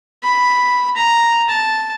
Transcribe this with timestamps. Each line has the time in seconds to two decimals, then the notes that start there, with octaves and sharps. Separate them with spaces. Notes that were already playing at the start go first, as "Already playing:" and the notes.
0.23 B5
0.96 A#5
1.49 A5